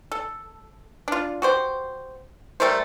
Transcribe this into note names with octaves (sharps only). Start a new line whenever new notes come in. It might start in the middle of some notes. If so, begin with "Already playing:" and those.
A4
D4 F4
F#4 G4 C5
G3 A3 A#4 C5